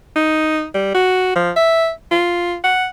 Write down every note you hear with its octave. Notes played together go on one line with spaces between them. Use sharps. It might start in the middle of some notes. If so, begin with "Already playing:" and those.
D#4
G3
F#4
F3
E5
F4
F#5